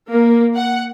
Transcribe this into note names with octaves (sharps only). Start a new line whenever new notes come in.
A#3
F#5